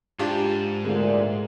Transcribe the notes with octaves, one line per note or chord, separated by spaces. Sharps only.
G#2 D4 F4 G4
D2 A#2 D3 G#3